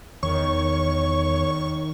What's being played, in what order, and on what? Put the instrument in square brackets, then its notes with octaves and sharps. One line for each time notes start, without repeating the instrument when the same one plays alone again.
[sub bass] E2 [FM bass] D#3 [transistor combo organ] C#5 [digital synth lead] C#6